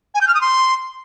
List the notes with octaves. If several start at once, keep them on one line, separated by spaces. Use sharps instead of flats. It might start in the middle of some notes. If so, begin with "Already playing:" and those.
G#5
G6
F6
D#6
C6